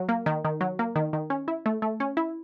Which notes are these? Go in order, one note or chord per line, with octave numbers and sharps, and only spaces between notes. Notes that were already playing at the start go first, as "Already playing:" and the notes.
Already playing: F#3
A#3
D#3
D#3
F#3
A#3
D#3
D#3
C#4
E4
A3
A3
C#4
E4